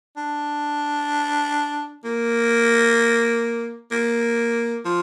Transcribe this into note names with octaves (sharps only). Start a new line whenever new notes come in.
D4
A#3
A#3
F3